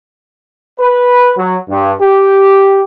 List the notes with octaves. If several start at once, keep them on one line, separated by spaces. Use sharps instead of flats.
B4
F#3
G2
G4